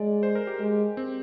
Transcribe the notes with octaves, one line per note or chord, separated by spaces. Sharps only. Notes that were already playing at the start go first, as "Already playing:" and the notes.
Already playing: G#3 D5
C5
A#4
G4
G#3
C4